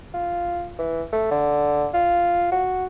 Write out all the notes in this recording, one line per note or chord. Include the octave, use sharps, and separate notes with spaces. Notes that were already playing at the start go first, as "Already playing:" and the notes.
F4
E3
A3
D3
F4
F#4